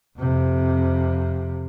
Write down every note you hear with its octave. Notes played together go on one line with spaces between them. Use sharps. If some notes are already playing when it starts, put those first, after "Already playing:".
F2 C3